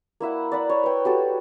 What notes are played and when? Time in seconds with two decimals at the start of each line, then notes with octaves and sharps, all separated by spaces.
0.20 A#3 E4 E5 F#5
0.52 D5 F#5 B5
0.69 C#5
0.84 B4 G5
1.05 F#4 G4 A4